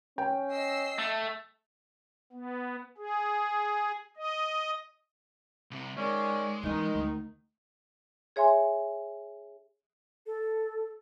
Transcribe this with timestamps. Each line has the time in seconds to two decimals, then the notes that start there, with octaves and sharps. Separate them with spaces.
0.18 C#4 G5
0.53 D#5 E6 C7
0.98 A3
2.32 B3
2.98 G#4
4.17 D#5
5.71 C2 C3
5.98 D#3 G#3 C#4 D5
6.63 D#3 E3 C#4 D#4
6.94 D2
8.36 G#4 C#5 E5 G#5 C6
10.26 A4